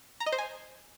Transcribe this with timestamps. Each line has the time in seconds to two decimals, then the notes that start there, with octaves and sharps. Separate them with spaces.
0.20 A#5
0.26 D#5
0.32 C5
0.38 G#5